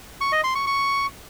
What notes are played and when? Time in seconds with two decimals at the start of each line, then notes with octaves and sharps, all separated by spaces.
0.21 C#6
0.32 D#5
0.44 C6
0.55 C#6
0.67 C#6